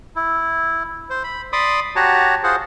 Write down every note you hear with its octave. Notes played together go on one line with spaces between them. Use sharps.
E4
C5
B5
D5 B5 C6 D6 D#6
F#4 G4 C#5 F#5 A5 A#5
F4 G#4 C5 F#5